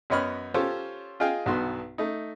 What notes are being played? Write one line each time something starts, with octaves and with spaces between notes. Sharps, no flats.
F#2 B3 C#5 D#5 B5 F6
C#4 F4 G4 A4 C5 C#5
F4 G#4 D#5 F5 G5
B1 G2 B3 F#4 C6
A3 D#4